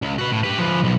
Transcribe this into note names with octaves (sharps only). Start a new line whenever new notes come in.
C#2
F#4 B4
A2
G4 B4
F3 B4
B1